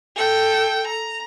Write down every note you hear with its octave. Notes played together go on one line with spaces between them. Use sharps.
A4 G5
A#5